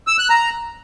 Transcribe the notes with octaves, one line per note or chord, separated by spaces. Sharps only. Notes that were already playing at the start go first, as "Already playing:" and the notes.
E6
F#6
A#5